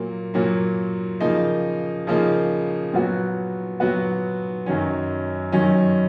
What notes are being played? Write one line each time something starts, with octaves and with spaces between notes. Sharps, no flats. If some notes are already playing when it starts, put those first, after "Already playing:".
Already playing: A#2 F#3 A#3
A#2 F#3 A#3
C#3 F3 A#3 D#4
C#3 F3 A#3 D#4
A#2 F#3 B3 F#4
A#2 F#3 B3 F#4
F#2 D#3 F#3 C#4
F#2 D#3 F#3 C#4